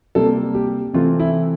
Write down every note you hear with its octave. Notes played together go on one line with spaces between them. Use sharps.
C3 G3 A#3 A4
G4
C3 E3 A3 C4 F4
E4